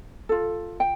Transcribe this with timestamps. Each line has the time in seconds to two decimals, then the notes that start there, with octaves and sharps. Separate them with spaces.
0.29 F4 A4
0.80 G5